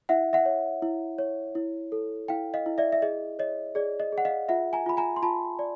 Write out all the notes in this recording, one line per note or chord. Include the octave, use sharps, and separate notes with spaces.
E4 E5 F#5
E5 F#5
C#5
E4
C#5
E4
A4
E4 F5 G5
D#5 F5
E4
D5 E5
E5
G#4 D#5
C#5 D#5
G#4 D5
D#5
G#4
F#5
D#5 F5
F4 E5 F#5
G#5 A#5
F4 B5
G#5 A#5
C6
F4 A5 B5
D5